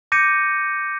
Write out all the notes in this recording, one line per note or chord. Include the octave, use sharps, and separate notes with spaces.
D6 G6 A#6 C#7 D#7